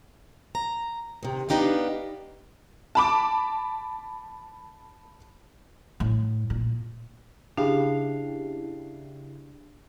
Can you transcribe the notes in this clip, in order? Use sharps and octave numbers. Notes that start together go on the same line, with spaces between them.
A#5
C3 D#3
B3 D4 D#4 G4 B4 F5
A5 B5 D6
A2
A#2
C#3 D4 E4 G4 G#4 F5